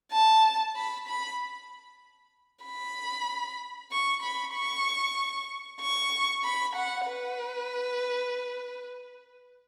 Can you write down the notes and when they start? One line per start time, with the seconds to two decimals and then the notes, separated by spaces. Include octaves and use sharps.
0.12 A5
0.76 B5
1.07 B5
2.64 B5
3.91 C#6
4.22 B5
4.54 C#6
5.81 C#6
6.43 B5
6.75 F#5
7.07 B4